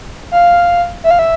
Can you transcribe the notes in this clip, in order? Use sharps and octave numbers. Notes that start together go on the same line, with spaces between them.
F5
E5
F5
E5